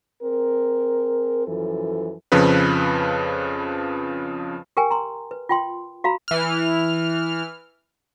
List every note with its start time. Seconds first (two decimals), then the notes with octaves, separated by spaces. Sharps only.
0.22 C4 G#4 A#4
1.46 F#2 E3 F3 A4
2.32 F2 C#3 F3 B4
4.77 G4 A#4 G5 G#5
4.91 A#5 C6
5.31 B4
5.49 F4 G5 C6
6.04 F#4 F5 A#5 B5
6.28 E3 F6